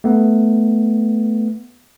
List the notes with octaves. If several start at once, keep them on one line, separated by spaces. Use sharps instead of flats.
A3 B3